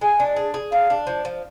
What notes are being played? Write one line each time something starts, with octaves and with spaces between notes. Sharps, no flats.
G#3 G#5
D4
G#4
G#4
D4 F5
D4
F3
F3